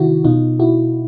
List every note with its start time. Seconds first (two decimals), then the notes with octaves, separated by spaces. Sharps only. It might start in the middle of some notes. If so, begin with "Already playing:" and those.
Already playing: C3 D#3 E4 F#4
0.24 B2 D#4 F4
0.60 E4 F#4